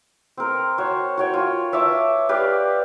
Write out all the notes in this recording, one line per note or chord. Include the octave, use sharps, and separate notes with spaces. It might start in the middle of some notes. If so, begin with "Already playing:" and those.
C4 A#4
F#4 C5 C#5
F#4 C#5 G5
F4
C#5 E5 A5 D6
G4 B4 D5 F5